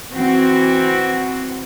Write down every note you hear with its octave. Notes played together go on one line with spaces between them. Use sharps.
E3 C4 F#4